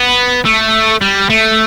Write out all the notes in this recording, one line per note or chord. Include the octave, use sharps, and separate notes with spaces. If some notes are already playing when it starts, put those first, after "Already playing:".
Already playing: B3
A3
G3
A3